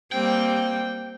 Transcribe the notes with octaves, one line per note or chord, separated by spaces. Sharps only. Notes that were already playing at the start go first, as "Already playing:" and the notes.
G3 A#3 C4 G5